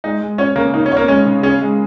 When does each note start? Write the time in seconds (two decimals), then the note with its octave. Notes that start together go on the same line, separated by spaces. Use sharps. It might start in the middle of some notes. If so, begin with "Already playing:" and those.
0.04 G#3 D#4
0.21 G#3
0.38 C#4 C#5
0.56 C#3 A#3
0.74 A#3 D#4
0.86 C#4
0.92 C#5
0.97 A#3
1.08 G#3 C#4
1.26 C#3
1.43 C#4 G#4
1.61 G#3